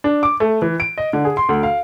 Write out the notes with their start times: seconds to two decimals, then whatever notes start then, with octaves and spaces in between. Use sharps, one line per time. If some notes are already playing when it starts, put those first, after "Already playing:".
0.04 D4
0.23 D6
0.40 A3
0.62 E3
0.80 D7
0.98 D#5
1.13 D3
1.25 G#4
1.37 C6
1.49 D2
1.63 F5